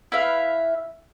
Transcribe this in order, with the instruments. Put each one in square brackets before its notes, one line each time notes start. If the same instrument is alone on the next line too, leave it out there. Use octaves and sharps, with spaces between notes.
[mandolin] E4 B4 E5 F5